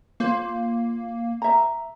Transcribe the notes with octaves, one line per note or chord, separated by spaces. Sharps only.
A#3 F4 C5
E5 A#5